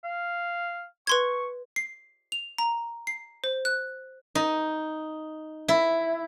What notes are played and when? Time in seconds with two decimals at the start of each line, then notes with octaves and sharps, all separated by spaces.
0.04 F5
1.07 B4 C6 C#6 G#6
1.76 C7
2.32 F7
2.58 A#5
3.07 C7
3.44 C5
3.65 F#6
4.35 D#4
5.68 E4